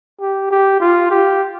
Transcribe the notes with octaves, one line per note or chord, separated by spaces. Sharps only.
G4
G4
F4
G4